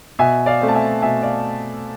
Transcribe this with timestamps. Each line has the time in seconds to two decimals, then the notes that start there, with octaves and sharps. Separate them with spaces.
0.19 B2 E5 G#5
0.46 D5 F5
0.61 A3 C4
0.68 A5
0.74 E5 G#5
1.02 B2 E5 G#5
1.23 D5 F5